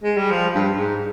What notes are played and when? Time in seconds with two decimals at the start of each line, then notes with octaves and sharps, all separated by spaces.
0.04 G#3
0.17 G3
0.31 F3
0.55 G2
0.78 G#2